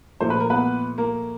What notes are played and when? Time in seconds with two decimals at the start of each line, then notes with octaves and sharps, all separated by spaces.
0.21 A#2 F3 A3 C5
0.30 B4
0.40 A#4
0.50 B3 B4
0.98 A#3 A#4